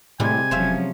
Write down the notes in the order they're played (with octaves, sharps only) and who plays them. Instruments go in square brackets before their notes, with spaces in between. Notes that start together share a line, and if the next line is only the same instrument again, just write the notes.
[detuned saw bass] A2 [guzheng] C3 G3 G#3 [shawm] G#5
[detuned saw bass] E1 [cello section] F3 F#3 C#4 [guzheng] C5 E5 F5